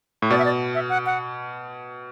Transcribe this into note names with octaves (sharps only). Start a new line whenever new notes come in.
A2
B2 D5
E5
D5
E5
F#5
F#5